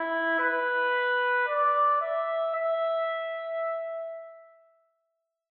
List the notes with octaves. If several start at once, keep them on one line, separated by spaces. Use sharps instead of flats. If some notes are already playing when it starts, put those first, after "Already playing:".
Already playing: E4
B4
D5
E5
E5